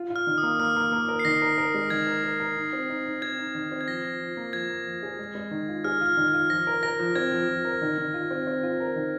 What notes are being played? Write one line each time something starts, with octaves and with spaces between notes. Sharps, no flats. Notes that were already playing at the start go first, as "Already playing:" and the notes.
Already playing: F4
F4
F6
D#3
D#6
A#3
A#3 F6
A#3
A#3
A#4
C7
D#3 A#6
A#4
A#4
G#3
D#3 G#6
A#4
A#4
A#4
D#4
C4
D#4
D#4
C4 G#6
D#4
D#3
C4
G#6
F3 A#6
F3
F3
A#3
F3 G#6
A#3
F3
G#4
G#3
G#3
D#3
F4
G#4 F6
F4
F6
D#3
F6
F4
F3 A#6
A#4
A#4 A#6
F3
C4 G#6
F3
F3
A#4
D#3
D#3
F4
C4
C4
F4
A#4
D#3